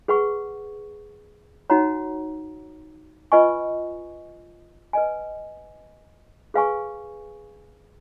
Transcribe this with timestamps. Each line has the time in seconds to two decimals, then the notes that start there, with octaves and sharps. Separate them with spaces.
0.08 G#4 B4 F#5 C#6
1.70 D#4 F#4 C#5 F#5 A#5
3.32 F4 B4 D#5 G#5 C#6
4.93 B4 D#5 G#5
6.54 G#4 B4 F5 G#5 C#6